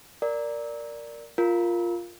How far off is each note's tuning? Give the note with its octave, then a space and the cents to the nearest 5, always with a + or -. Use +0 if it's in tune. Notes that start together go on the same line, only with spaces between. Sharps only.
A#4 +0 D5 +0
F4 +0 A#4 +0